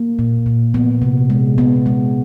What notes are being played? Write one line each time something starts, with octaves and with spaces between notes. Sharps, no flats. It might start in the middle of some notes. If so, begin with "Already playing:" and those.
Already playing: A#3
A#2
A#2
F3 B3
C3
G#3
C3 B3
G#3